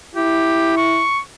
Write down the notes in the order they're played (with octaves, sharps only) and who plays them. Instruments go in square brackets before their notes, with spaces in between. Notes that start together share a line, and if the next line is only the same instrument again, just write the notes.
[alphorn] E4 [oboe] G4
[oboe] C#6